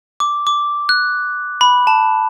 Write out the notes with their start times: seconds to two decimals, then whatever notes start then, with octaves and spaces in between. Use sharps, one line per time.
0.20 D6
0.47 D6
0.89 F#6
1.61 B5
1.87 A5